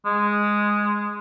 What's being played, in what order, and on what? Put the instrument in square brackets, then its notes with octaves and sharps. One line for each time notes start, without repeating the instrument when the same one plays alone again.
[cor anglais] G#3